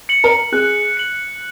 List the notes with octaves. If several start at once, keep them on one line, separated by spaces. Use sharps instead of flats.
C#7 F#7
A#4
G#4 F#6
C#7 F#7